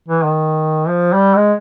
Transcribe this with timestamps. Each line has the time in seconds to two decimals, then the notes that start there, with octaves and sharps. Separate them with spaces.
0.08 E3
0.24 D#3
0.88 F3
1.13 G3
1.37 G#3